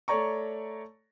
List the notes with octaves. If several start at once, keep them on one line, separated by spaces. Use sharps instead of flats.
A3 C#5 D5 A#5 C#6